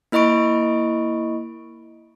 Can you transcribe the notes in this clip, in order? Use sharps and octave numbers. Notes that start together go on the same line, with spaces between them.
A#3 E4 D#5 B5 C#6 D7